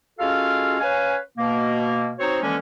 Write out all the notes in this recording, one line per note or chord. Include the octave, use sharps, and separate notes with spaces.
G#3 C#4 F4 F#4 A4 F5
C#4 B4 F5 G#5
B2 A#3
C4 D#4 F#4 C5 C#5
D3 E3 F3 G#3 A#3 C#4